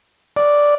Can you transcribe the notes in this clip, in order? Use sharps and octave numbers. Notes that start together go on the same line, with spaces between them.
D5